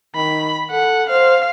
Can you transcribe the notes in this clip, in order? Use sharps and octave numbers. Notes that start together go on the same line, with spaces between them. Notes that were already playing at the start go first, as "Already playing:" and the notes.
D#3 B5
A4 F#5
C5 F5